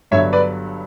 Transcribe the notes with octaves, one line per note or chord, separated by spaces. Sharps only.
G1 G2 D3 F#3 C#5 E5
B4 D5